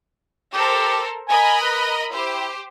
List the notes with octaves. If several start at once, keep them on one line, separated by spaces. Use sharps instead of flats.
G4 A4 A#4 C5
A#4 D#5 G#5 B5
B4
E4 G4 C5